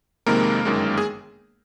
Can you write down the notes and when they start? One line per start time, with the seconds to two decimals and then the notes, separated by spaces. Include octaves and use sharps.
0.26 F2 C3 D#3 G#3 A#3 A#4
0.65 G1 F#2 D#3 G#3
0.98 G#4